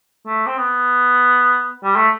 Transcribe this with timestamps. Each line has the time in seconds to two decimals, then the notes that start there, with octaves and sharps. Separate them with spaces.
0.26 A3
0.46 C4
0.57 B3
1.84 G3
1.96 A3